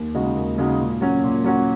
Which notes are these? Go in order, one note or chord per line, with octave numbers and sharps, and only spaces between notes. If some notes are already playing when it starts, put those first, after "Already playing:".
Already playing: D#2
C#3 G#3 D#4 F#4
D#2
C#3 G#3 D#4 F#4
A#2
F#3 C#4 F#4
A#2
F#3 C#4 F#4